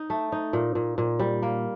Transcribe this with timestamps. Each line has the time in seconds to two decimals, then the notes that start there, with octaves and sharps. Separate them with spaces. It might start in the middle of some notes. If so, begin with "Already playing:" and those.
Already playing: D#4
0.10 A3
0.32 D#4
0.53 A#2
0.75 A#2
0.98 A#2
1.19 G3
1.42 A#3